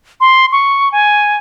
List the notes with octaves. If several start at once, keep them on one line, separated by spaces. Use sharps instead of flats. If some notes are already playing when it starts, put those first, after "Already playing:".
C6
C#6
G#5